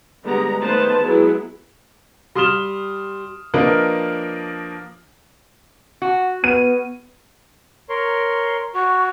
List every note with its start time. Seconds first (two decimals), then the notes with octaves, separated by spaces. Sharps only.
0.25 D3 G3 G#3 B3 G4 A#5
0.61 D#3 A3 B3 B4 C5 A5
1.02 F#3 G#3 B3 E4 G#4
2.35 G3 C6 D#6 F6 E7 G7
3.54 F3 A#3 D4 A#4 B4 D#5
6.02 F#4
6.44 B3 D#7
7.89 A#4 C#5 C6
8.75 F#4 C#6